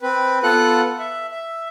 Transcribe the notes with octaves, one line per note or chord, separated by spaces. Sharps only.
C4 B4
B3 F4 A4 F#5 F#6
E5
E5